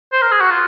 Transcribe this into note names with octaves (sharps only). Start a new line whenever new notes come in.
C5
A#4
G#4
F#4
F4